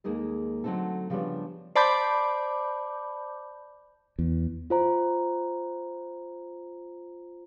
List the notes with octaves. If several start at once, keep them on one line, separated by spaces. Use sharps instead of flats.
D#2 G#3 A#3 D#4 G#4 A4
D3 F#3 A3 C4 D#4 A4
C#3 F3 G3 B3 D4 C#5
C5 D5 A5 B5 D6 G6
E2
F4 C5 A#5